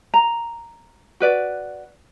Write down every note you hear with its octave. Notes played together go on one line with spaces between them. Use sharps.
A#5
F#4 B4 D5